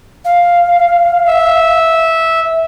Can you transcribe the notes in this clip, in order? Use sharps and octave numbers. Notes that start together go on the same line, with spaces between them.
F5
E5